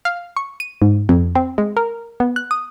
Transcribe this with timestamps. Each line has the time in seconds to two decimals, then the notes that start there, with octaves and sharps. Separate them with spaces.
0.05 F5
0.37 C#6
0.60 D#7
0.82 G#2
1.09 F2
1.35 C4
1.58 G#3
1.77 A#4
2.20 B3
2.36 F#6
2.51 D#6